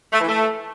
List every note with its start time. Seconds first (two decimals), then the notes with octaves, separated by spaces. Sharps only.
0.13 A3
0.21 E3
0.29 A3